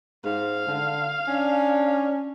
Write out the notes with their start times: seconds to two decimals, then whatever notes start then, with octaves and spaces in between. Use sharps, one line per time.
0.25 G#2 F5
0.68 D3
1.27 C#4 D4